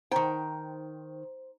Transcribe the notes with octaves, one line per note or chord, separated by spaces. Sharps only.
D#3 D#4 C5 G5 A#5